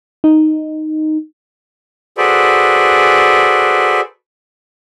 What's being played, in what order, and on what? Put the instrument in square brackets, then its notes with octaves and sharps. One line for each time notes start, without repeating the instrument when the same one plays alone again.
[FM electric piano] D#4
[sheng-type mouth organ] F#4 G#4 A4 B4 C5 D5